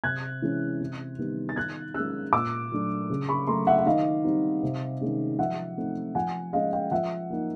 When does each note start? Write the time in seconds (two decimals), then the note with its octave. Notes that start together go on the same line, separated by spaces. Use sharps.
0.04 C3 F#6 G#6
0.42 E3 G#3 C#4
0.80 C3
1.19 D#3 G3 B3
1.49 A6
1.56 D#3 F#6 G#6
1.94 G#3 C#4 E6 F#6
2.33 A#2 D6 E6
2.72 F#3 A3 D4
3.10 C#3
3.29 B5 C#6
3.47 F#3 A3 A#5 C6
3.67 E5 F#5
3.79 F#5
3.86 D#3 D#5 F5
4.24 G3 C4 D#4
4.63 C3
5.01 D#3 G#3 C#4
5.38 F3 E5 F#5
5.78 A3 C4 D#4
6.15 F3 F#5 G#5
6.53 G#3 C#4 D#5 F5
6.73 F5 G5
6.91 F3 E5 F#5
7.30 A#3 D#4